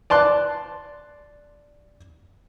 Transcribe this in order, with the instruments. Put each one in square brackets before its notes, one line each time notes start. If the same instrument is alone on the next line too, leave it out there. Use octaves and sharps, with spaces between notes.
[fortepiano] D5 A5 C6 F#6